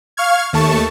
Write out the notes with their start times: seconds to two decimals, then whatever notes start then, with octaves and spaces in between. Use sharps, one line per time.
0.17 F5 C#6 F6 G#6
0.53 D#2 A3 A5 C#6